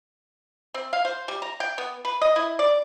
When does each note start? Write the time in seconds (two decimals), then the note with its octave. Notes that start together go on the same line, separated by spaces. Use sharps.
0.74 C4
0.93 F5
1.05 C5
1.28 G3
1.42 A#5
1.60 G5
1.78 B3
2.05 B4
2.22 D#5
2.36 E4
2.59 D5